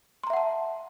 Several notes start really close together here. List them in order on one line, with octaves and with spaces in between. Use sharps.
C6 A#5 E5 F#5 A5